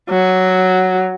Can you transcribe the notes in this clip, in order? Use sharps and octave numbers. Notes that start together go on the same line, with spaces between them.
F#3